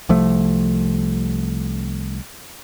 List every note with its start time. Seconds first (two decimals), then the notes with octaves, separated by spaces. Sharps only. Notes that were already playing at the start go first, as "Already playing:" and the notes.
0.09 C2 F3 A3